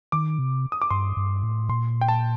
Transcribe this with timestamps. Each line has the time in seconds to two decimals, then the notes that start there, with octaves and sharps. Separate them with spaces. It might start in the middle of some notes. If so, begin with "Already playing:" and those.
0.12 D#3 D6
0.39 C3
0.72 D#6
0.82 D6
0.91 G2 C6
1.17 G2
1.43 A2
1.69 A#2 C6
2.01 G5
2.09 A5